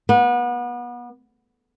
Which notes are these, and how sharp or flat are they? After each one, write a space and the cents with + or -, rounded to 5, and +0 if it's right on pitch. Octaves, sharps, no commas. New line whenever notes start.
B3 -30